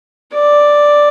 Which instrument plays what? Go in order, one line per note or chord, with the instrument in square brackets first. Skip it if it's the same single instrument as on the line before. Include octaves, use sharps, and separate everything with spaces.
[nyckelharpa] D5